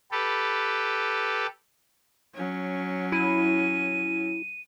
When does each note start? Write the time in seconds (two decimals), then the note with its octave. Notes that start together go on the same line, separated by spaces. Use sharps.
0.11 G4 A4 B4
2.35 F#3 C#4
3.12 E4 D#7